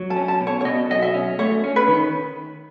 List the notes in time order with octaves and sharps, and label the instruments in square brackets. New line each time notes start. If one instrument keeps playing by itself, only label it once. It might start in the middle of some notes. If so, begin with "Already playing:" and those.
Already playing: [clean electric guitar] F#3
[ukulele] A5
[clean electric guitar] C#4
[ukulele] A5
[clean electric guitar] B2
[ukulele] C#5
C#5
[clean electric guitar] B2 [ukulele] D#5
[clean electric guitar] F#3 [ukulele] D#5
[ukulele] E5
[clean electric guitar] C#4
[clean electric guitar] A3 [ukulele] C#5
[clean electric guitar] C#4
[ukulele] B4
[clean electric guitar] D#3